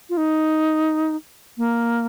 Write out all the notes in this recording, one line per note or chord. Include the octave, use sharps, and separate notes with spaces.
F4
D#4
A#3